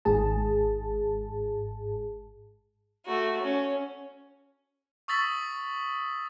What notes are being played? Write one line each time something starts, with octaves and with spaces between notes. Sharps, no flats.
G#1 G#2 G#4 A5
A3 F#4
C#4
C#6 D#6 E6 A6 B6 F#7